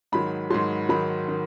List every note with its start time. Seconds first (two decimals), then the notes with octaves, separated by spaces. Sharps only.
0.12 G#2 D#3 F#3 B5
0.51 G#2 D#3 F#3 C6
0.89 G#2 D#3 F#3 B5
1.28 D#3